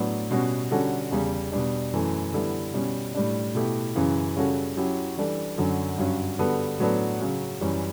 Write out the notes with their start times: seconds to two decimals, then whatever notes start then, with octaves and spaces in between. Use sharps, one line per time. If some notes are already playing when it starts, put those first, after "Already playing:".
Already playing: A2 F#3 B3 D4
0.31 B2 G3 C#4 F#4
0.71 D3 G3 C#4 F#4 A4
1.12 E2 C#3 G3
1.52 B2 G3 D4
1.93 F#2 E3 A3
2.33 D3 G3 B3 E4 A4
2.74 B2 G3 C#4
3.15 A2 G3 D4
3.55 B2 A3 E4 G4
3.95 F#2 C#3 E3
4.36 C#3 G3 C#4 F#4 A4
4.77 F#3 C#4 E4 G4
5.17 E3 G3 D4 A4
5.57 F#2 D3 F#3
5.98 G2 F#3 C#4
6.39 D3 G3 B3 F#4 A4
6.80 A2 F#3 B3 D4 A4
7.20 C#3 F#3 C#4
7.61 F#2 E3 G3 C#4